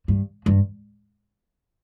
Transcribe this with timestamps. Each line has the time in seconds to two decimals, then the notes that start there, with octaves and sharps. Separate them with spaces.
0.08 G2
0.46 G2